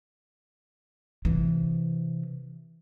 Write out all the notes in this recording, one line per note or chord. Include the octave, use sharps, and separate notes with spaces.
C3 E3